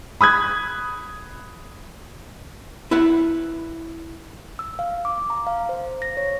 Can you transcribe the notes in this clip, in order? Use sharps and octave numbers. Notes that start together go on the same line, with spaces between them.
B5 D#6 F#6 G#6
E4 B4 E5 F#5
E6
F5
D6
A#5
F5
C5
A#6
C#5